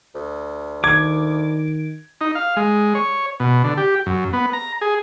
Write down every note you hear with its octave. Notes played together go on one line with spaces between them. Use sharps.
D2
D#3 D6 G#6
D#4
F5
G#3
C#5
B2
D3
G4
F#2
B3
A#5
G#4